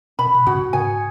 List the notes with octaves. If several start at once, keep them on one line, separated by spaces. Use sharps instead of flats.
B2 B5
B2
G#2 C#3 F#4
G#2 C#3 G#5